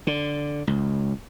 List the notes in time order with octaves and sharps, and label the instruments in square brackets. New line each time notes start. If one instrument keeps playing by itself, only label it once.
[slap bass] D3
C#2